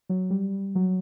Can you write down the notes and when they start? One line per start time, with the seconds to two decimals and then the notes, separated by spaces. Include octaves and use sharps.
0.09 F#3
0.30 G3
0.75 F#3